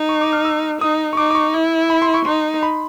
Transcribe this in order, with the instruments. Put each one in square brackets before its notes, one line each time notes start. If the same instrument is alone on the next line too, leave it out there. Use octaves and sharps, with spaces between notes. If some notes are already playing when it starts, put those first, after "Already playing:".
Already playing: [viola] D#4
[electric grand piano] C#6
D6
F6
E6
[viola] D#4 [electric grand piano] D#6
[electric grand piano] C#6
[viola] D#4 [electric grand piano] D6
[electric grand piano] D6
C#6
[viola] E4
[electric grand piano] B5
C6
C#6
[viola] D#4 [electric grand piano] C6
[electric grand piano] B5